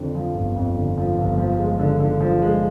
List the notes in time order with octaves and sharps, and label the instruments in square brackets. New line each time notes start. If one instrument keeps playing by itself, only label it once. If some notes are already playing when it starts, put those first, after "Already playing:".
Already playing: [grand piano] F2 D3
F3
G1
F2
D3
F3
G1
F3
G#3
D3
D3
F3
G#3